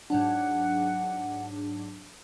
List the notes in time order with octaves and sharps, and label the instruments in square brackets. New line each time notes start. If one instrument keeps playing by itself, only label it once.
[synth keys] G#2 F#3 D4 [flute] F#5